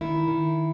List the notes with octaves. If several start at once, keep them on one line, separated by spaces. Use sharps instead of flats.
D#3 E4
D#3